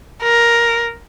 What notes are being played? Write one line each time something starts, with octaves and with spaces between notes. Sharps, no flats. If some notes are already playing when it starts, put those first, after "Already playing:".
A#4